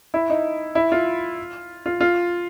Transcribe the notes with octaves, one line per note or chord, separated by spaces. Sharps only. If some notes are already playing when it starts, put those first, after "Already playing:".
E4
D#4
E4
F4
F4
F4